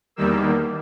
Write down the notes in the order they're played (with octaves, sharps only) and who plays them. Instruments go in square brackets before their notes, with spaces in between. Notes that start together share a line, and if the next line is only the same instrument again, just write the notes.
[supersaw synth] E2 D#3 G3 A#3 E6